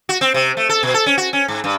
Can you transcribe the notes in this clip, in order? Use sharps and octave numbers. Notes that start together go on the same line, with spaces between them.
F#4
C4
C3
A3
A4
B2
A4
C#4
F#4
C#4
G#2
G2